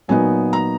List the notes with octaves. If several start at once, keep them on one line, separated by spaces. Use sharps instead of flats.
A#2 F#3 B3 D#4 G#5
A#5